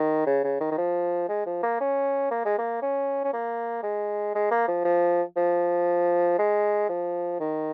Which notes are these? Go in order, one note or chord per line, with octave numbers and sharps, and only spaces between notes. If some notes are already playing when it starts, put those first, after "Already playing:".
Already playing: D#3
C#3
C#3
D#3
D#3
F3
G#3
F3
A#3
C#4
A#3
G#3
A#3
C#4
C#4
A#3
G#3
G#3
A#3
F3
F3
F3
G#3
F3
D#3